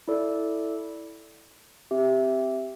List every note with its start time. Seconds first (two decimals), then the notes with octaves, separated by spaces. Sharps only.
0.08 E4 A4 D5
1.91 C4 G4 E5